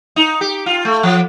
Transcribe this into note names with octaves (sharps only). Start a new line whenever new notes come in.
D#4
G4
F4
A3
F3